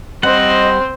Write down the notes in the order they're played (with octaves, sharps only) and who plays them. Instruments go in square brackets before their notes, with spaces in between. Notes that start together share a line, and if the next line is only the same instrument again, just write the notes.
[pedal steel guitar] G3 F#5 [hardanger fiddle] C4 C5 [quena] D#5